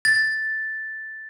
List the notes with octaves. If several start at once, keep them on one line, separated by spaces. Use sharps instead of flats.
A6